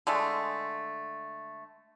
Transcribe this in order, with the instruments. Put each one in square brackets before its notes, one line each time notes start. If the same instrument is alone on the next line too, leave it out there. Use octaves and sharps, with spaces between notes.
[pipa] D3 G#3 A3